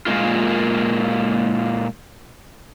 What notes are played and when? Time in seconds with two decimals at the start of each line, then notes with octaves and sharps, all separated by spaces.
0.06 A#2 C#3 G#3 A#3 F4